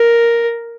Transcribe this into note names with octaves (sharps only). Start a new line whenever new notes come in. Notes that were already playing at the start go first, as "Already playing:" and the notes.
Already playing: A#4